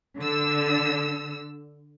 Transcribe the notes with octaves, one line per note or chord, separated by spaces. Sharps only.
D3 E6